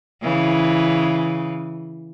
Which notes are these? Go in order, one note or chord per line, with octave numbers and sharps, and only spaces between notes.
C#3 E3